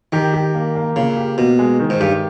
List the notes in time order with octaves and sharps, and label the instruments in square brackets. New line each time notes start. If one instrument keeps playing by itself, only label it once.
[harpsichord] D#3 [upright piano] G4
[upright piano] G4
A#3
A#3
[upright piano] A#2 [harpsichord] C#3
[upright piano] G4
[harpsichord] B2 [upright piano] B3
[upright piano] G#3
D#3
[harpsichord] G#2
[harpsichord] G2 [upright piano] G4